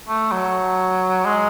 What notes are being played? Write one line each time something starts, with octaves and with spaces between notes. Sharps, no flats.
A3
F#3
G#3